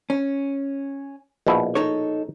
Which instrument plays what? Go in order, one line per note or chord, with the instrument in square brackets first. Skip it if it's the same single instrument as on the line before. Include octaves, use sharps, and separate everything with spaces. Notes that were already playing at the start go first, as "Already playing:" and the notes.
[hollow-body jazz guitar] C#4
[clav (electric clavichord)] A#1 B2 E4
[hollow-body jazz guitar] D#4 A4 C#5